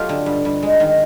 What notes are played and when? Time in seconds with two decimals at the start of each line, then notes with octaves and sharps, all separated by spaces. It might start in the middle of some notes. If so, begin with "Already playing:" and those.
Already playing: F#3 A3 F4 G4
0.09 D3
0.26 G2
0.45 G2
0.63 G#3
0.80 D#3